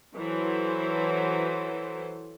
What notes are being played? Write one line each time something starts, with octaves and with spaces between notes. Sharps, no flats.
E3 F#3 E4 A4 C5